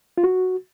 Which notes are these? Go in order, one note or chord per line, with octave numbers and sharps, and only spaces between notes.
F4
F#4